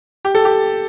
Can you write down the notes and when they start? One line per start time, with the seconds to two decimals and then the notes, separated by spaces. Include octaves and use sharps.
0.25 G4
0.35 A4
0.45 G4